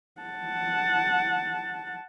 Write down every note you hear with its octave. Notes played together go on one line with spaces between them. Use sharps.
F#5 A5